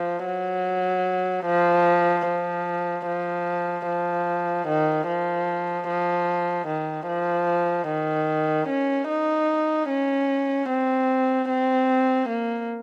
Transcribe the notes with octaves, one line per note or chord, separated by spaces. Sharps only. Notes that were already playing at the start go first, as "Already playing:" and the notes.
Already playing: F3
F#3
F3
F3
F3
F3
D#3
F3
F3
D#3
F3
D#3
C#4
D#4
C#4
C4
C4
A#3